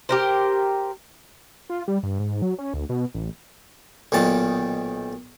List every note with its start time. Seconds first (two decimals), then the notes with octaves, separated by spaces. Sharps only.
0.09 G4 A#4 C5
1.70 F4
1.88 G3
2.03 G2
2.19 G#2
2.42 F#3
2.59 C#4
2.74 D2
2.89 B2
3.15 A1
4.12 B1 A#2 D#3 A5